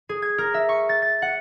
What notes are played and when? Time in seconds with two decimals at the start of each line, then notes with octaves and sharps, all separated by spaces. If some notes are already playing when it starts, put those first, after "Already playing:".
0.09 G#4
0.22 G#6
0.38 A#4
0.54 E5
0.69 C#6
0.89 A6
1.02 A6
1.22 F#5